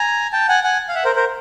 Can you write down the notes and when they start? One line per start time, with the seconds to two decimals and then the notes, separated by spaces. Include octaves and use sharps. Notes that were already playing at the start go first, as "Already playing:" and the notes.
Already playing: G#5 A#5
0.32 G5 A5
0.48 F#5 G#5
0.64 F#5 G#5
0.89 F5
0.94 E5 F#5
1.05 A#4 C5
1.15 A#4 C5